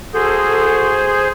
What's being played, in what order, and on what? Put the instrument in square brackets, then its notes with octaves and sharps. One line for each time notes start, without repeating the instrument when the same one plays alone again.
[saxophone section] F#4 A4 [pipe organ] G#4 C5